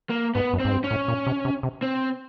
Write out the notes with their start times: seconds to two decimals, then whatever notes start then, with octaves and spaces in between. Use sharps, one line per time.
0.10 A#3
0.35 G#2 B3
0.53 F#2
0.60 C4
0.65 G#2
0.72 G2
0.84 C#4
0.91 A2
1.08 A#2
1.27 C3
1.45 C3
1.63 C3
1.82 C4